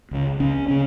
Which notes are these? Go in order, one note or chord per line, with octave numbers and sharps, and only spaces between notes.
C#2 C#3
C#2 C#3 C#4
C#3 C#4